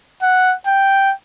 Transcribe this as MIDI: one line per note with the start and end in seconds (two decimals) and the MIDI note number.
0.23 0.54 78
0.67 1.13 79